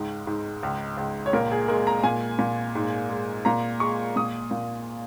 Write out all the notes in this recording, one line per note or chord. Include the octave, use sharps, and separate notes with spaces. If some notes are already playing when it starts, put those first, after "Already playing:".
Already playing: C#2 G#2
G#2
C#2
C#2
C#5
A#2 A#4
G#4
G#3 A#4
A#5
A#2 G#5
A#2
G#2
G#3
A#2 A#5
G#3 C#6
A#2 D#6
A#2